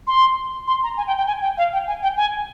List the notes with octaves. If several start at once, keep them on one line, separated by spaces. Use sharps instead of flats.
C6
C6
A#5
G#5
G5
G5
G#5
G5
F5
G5
G#5
G5
G#5